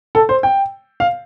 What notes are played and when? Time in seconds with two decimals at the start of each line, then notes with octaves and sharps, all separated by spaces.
0.15 A4
0.29 C5
0.43 G5
1.00 F5